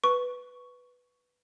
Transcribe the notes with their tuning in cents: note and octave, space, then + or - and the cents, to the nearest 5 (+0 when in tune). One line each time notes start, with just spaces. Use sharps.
B4 +0 C#6 +10